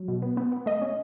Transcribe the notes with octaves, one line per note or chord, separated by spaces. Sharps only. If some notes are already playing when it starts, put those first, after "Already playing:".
Already playing: F#3
B2
B3
B3
B3
A3 D#5
C#4